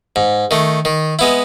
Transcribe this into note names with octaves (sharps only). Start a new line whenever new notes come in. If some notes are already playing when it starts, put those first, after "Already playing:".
G#2
D#3 A3
D#3
G#3 B3 E4